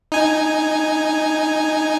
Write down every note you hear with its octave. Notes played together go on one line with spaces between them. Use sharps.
D#4 G#5